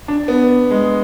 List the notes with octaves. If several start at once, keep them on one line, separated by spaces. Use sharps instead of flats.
D4
B3
G#3